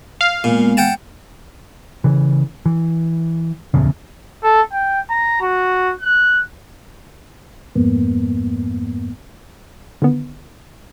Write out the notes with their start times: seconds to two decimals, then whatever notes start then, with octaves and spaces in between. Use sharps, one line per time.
0.21 F5
0.44 A#2 G#3 B3
0.77 F#5 G5 A5
2.04 C#3 E3
2.66 E3
3.74 D1 A#1 E2 C#3
4.43 A4
4.73 G5
5.10 A#5
5.41 F#4
6.01 F#6
7.75 F2 G#2 A#3 B3
10.02 D3 D#3 B3